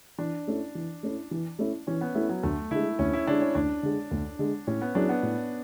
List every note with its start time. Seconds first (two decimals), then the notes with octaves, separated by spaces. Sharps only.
0.18 E3 D4
0.47 A3 C#4 E4
0.75 E3
1.03 A3 C#4 E4
1.31 E3
1.59 A3 C#4 E4
1.87 E3 C#4
2.01 B3
2.15 A3 C#4 E4
2.29 F#3
2.43 D2 A3
2.71 D3 G#3 E4
2.99 D2 C#4
3.13 E4
3.27 D3 G#3 D4
3.41 C#4
3.55 D2 D4
3.83 D3 G#3
4.11 D2
4.39 D3 G#3
4.67 A2 C#4
4.82 B3
4.95 F#3 C#4 D4 E4 G#4
5.09 B3
5.23 A2